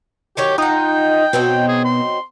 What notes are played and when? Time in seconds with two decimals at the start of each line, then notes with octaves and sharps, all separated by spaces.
0.37 D#3 F#3 G4 C#5
0.58 D#4 F4 F#5 G5
1.33 B2 F#3 C4 D#4
1.68 G#4
1.85 C6